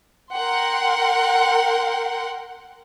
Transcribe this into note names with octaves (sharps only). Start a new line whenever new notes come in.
A#4 F#5 G5 C6